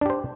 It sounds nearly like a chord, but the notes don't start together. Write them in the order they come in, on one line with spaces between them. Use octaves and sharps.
D4 G4 C5